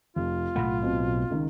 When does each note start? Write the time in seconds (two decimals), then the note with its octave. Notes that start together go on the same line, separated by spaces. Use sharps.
0.16 F1 F4
0.56 B1 A2 A3 F#5 B5
0.82 B2 C4
1.30 C#2 D#3